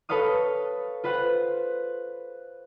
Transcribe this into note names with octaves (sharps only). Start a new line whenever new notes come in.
A4 B4 C#5 F5 D#6
F4 B4 C5 F#5